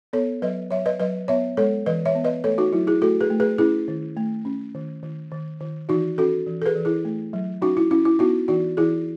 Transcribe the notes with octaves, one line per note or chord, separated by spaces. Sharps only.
B3 A4 C#5
F#3 B4 D#5
F#3 C#5 E5
B4 D#5
F#3 B4 D#5
B3 C#5 E5
G#3 A4 C#5
E3 B4 D#5
C#5 E5
B3
B4 D#5
A3 A4 C#5
D#4 F#4
F#3 E4
E4 G#4
A3 F#4 A4
G#4 B4
A3
G#4 B4
C#4 E4 G#4
D#3
A3
C#4
D#3
D#3
D#3
D#3
E3 D#4 F#4
C#4 F#4 A4
E3
A4
G#4 B4
E3
E4 G#4
A3
F#3
C#4 D#4 F#4
E4
C#4 E4
E4
B3 D#4 F#4
E3 D#4 F#4
E3 E4 G#4